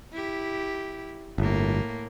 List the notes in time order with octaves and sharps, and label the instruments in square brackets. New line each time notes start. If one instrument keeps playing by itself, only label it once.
[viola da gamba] E4 G4
[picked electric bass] G1 [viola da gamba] A2 A#3